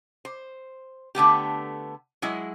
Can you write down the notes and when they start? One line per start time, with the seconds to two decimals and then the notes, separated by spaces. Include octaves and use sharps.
0.25 C5
1.15 D3 A3 B3 G4
2.22 F#3 G#3 E4